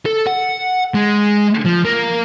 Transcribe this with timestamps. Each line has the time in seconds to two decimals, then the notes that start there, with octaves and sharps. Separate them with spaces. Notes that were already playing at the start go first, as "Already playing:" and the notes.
0.06 A4
0.27 F#5
0.94 G#3
1.66 F3
1.85 A#3